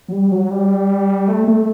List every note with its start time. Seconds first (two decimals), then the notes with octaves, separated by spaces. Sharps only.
0.08 F#3
0.12 G3
0.32 F#3
0.51 G3
1.28 A3
1.48 A3